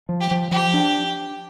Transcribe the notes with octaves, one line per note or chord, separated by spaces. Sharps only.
F3
G4
F3
F3 G4
D4